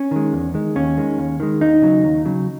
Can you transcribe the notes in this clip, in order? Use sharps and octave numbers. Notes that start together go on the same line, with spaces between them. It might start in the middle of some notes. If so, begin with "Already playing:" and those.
Already playing: C#4
D#3 G#3
E2
D#3 G#3
D#2 C#4
D#3 G#3
D#2
D#3 G#3
D#2 D#4
C#3 F#3
D#2
C#3 F#3